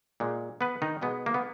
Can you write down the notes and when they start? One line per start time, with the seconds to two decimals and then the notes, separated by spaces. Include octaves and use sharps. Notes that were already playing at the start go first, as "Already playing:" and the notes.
0.20 A#2 G#3
0.61 B3 B4
0.82 D#3 D#4
1.01 B2 G#3 B3
1.26 A#3
1.34 B3